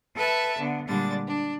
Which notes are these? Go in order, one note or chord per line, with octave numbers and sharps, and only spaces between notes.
A4 B4 E5 A5
D3 B3
A#2 D3 G3 G#3 D4 A6
D4